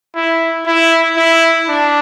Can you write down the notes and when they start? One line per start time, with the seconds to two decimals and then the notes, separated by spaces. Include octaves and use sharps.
0.15 E4
0.66 E4
1.17 E4
1.68 D4